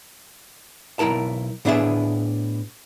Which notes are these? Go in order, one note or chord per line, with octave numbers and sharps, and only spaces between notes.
B1 E2 E4 A#4 A5
A2 B3 D4 E4 G#4 E5